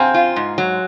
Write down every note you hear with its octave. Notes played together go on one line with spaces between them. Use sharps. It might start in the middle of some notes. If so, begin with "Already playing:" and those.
Already playing: C4 F5 F#5 G#5 A#5 C6
F4
G#2
F#3